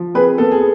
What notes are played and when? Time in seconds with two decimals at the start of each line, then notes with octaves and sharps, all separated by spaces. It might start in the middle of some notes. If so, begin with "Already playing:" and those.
Already playing: F3
0.14 C4 G#4 B4
0.38 B3 A4
0.51 G#4